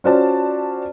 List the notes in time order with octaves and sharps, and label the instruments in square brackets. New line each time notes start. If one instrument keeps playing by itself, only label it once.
[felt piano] C#4 F4 F#4 C5 D5 A5